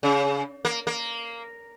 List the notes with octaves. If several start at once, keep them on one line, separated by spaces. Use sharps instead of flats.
C#3
A#3
A#3